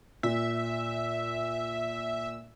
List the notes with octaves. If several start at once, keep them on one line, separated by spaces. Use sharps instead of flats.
A#2 E5